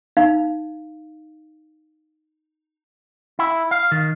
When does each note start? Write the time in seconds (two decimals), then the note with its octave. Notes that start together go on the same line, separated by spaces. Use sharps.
0.17 D#4 F5
3.39 E4
3.71 F5
3.92 D#3